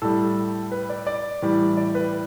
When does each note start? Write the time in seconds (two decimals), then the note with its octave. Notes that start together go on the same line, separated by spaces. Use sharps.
0.02 A2 G3 A4
0.72 B4
0.90 D5
1.07 D5
1.42 A2 E3 G3
1.77 D5
1.95 B4